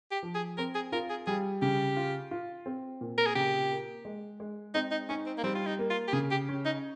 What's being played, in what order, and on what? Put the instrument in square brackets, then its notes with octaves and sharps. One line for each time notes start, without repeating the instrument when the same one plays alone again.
[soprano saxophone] G4
[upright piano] F3
[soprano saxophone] G#4
[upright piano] C4 [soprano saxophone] A#4
[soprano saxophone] G#4
[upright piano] F4 [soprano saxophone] A#4
[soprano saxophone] G#4
[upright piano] G3 [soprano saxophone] G#4
[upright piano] C#3 [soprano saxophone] G4
[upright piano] F4
F4
C4
A#2
[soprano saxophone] A#4
G#4
[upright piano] C#3 [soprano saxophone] G4
[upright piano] A#3
G#3
G#3
[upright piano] C4 [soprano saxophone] D#4
[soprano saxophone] D#4
[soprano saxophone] C#4 [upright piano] D#4
[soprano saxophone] C4
A#3
[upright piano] G3 [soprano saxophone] C4
[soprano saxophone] F4
D#4
[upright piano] A#3
[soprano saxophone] F4
G4
[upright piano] C#3 [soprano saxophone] G#4
[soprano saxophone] G4
[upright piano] C#4
[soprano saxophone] D#4